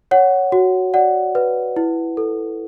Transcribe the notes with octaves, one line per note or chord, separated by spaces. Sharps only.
C#5 F#5
F#4
D5 F#5
B4
E4
A4